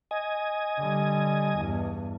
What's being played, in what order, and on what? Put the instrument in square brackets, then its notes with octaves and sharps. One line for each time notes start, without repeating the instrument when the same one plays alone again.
[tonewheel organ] D#5 G#5
[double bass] D3 G3
E2 G2